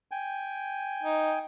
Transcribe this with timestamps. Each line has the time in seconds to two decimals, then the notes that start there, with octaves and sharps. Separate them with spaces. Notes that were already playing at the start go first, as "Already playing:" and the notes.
0.11 G5 G#5
1.03 D#4